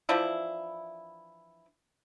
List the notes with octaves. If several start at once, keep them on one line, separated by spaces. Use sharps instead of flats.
E3 F3 D4 E4